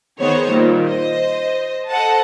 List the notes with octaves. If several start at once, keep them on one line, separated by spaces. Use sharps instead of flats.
D#3 B3 G#4 C5 C#5
A#2 D#3 G3
C5 D#5
A4 C5 D#5 F#5 A5